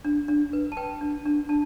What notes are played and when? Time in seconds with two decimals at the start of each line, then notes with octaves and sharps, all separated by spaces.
0.05 D4
0.28 D4
0.53 B4
0.72 A5
0.77 B4 G5
1.01 D4
1.26 D4
1.49 D4 A5